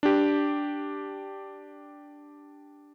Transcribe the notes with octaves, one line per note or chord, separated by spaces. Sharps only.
D4 G4